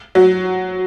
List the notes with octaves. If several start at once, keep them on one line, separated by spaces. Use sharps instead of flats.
F#3